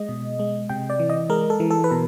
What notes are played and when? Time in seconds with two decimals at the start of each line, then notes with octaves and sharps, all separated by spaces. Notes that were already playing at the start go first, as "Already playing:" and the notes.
Already playing: G#3 D#5
0.09 B2
0.39 G#3
0.69 C3 G5
0.90 D5
0.99 E3
1.10 D#5
1.30 G#3 A#4
1.50 A4
1.60 E3
1.71 A4
1.84 B4
1.90 B2 A#4